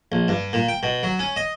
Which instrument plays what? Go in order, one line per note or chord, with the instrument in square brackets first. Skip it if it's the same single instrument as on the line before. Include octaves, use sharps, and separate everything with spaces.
[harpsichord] A#1
G2
A#2
G5
B2
F#3
C#4
D#5